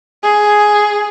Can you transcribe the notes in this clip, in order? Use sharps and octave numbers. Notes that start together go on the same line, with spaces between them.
G#4